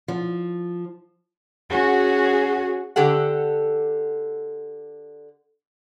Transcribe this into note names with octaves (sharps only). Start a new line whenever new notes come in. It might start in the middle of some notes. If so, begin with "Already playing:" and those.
F3
C#4 F#4 G#4
D3 G4 A4 F#5